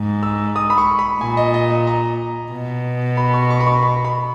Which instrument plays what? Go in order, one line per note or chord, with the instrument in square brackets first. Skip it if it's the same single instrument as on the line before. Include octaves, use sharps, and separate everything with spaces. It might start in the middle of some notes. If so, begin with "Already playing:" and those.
Already playing: [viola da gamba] G#2
[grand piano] E6
D#6
B5
C#6
B5
[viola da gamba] A#2 [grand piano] G#5
[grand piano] D#5
D#5
D#5
A#5
[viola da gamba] B2
[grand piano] B5
C#6
C#6
B5
C#6
B5
B5